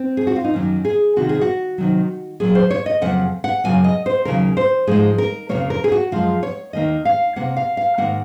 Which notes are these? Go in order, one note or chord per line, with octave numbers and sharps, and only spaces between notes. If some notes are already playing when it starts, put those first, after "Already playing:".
Already playing: C4
G#4
F#4
F4
D#4
F#2 D#3 F#3 A#3 C#4
G#4
F2 C3 D#3 F#4
G#4
F#4
C3 D#3 F#3
A#2 F#3 A#3 G#4
C5
C#5
D#5
F2 C#3 F#3 A#3 F#5
F#5
F#2 C#3 F#3 A#3 G#5
D#5
C5
D#2 C#3 F#3 A#4
C5
G#2 F3 G#3 G#4
A#4
F2 C#3 F#3 A#3 C#5
A#4
G#4
F#4
F#2 F3 G#3 F4
C#5
D#2 D#3 A#3 D#5
F5
C3 F#3 A#3 F#5
F5
F5
G#2 D#3 A#3 F#5